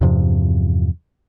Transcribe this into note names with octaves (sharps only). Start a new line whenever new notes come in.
E2 G2 C3 F3